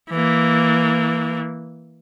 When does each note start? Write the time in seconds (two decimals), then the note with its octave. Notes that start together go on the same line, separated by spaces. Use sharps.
0.10 E3 A#3